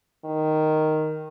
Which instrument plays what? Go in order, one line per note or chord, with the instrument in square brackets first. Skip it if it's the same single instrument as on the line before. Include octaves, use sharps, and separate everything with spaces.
[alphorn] D#3